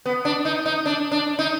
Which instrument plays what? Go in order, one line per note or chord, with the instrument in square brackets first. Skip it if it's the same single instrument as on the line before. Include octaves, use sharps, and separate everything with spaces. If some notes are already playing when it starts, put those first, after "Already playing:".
[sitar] B3
D4
D#4
D#4
D4
D4
D#4